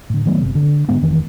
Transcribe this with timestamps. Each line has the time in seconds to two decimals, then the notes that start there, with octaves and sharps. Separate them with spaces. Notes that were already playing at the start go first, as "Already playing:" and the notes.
0.10 A2 D3
0.26 D#3 F#3 A3 B3
0.40 G1 C3
0.55 D3
0.89 G#2 D3 G#3 B3
1.01 F1 D#3 E3